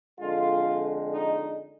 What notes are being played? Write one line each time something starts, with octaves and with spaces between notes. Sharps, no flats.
F2 D3 G#3 F4
D#4